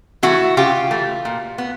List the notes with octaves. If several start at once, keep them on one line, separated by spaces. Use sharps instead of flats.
E3 A3 E4 F#4
C#3 F4 G4
E3 A3
A#2
B3